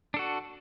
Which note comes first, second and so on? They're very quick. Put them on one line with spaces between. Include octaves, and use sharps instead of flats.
D4 A4 F#4